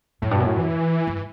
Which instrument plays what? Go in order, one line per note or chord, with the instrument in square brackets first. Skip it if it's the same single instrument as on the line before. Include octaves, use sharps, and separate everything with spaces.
[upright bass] F#2 [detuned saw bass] A2
[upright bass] G2 [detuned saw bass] B2
[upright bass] F#2
[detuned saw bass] A2
E3
[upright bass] G2